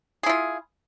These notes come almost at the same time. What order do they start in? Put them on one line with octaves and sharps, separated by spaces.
G#4 E4 F4